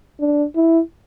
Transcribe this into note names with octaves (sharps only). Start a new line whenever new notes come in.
D4
E4